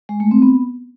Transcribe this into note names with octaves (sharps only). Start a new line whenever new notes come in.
G#3
A3
C4
B3